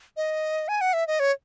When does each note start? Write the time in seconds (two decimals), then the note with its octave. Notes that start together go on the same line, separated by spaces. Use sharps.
0.17 D#5
0.68 G#5
0.81 F#5
0.93 E5
1.07 D#5
1.20 C#5